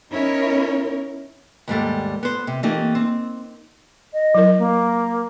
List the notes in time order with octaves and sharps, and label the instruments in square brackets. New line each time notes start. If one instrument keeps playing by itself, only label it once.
[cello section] B3 C#4 D#4 E4 A#4 C#5
[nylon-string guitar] D#2 G#2 G3 A3
B3 C5
C3
E3 A3 A#3 C4 D#4 G4
C4
[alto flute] D#5
[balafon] F#3 E4 A#4
[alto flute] A#3